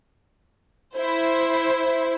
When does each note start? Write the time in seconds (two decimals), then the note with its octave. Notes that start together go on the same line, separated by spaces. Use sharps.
0.96 E4 C5